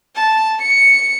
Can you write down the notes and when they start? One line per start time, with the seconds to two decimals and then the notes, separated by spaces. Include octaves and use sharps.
0.15 A5
0.62 C#7